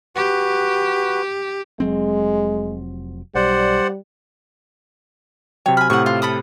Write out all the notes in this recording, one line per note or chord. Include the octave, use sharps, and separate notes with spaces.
F#4 G4 B4
F1 F#3 G#3 C4
B1 G3 C5 D5 F#5
C3 F#3 C#5 G5
G#5 B5 F6
A2 C3 F#5 C#6
F4
A4 B5 D#6